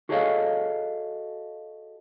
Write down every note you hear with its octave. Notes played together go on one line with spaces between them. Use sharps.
F#4 G#4 A4 C#5 D#5 F5